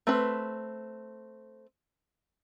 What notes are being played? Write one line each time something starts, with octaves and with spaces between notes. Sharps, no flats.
A3 C4 B4